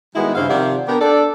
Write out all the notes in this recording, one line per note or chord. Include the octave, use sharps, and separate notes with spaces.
D#3 G3 G#3 B3 E4 F#4
G2 C#3 E4 C5 F5
C3 D#3 F3 D5 E5 F#5
B3 D4 G4 A#4
D4 A4 D5